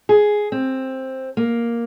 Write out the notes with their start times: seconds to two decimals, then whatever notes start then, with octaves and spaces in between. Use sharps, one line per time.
0.09 G#4
0.52 C4
1.37 A#3